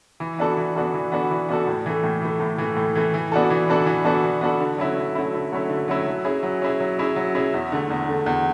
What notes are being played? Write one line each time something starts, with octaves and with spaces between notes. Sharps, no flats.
E3
B3 D4 F#4 A4
E3
B3 D4 F#4 A4
E3
B3 D4 F#4 A4
E3
B3 D4 F#4 A4
A2
E3 A3
A2
E3 A3
A2
E3 A3
A2
E3 A3
E3
B3 D4 F#4 A4
E3
B3 D4 F#4 A4
E3
B3 D4 F#4 A4
E3
B3 D4 F#4 A4
D3
F#3 A3 C#4 E4
D3
F#3 A3 C#4 E4
D3
F#3 A3 C#4 E4
D3
F#3 A3 C#4 E4
F#3
C#4 E4 G#4
F#3
C#4 E4 G#4
F#3
C#4 E4 G#4
F#3
C#4 E4 G#4
E2
D3 A3
E2
D3 A3
E2